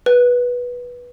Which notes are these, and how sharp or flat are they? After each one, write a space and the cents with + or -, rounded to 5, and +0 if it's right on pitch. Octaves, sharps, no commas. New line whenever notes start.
B4 -15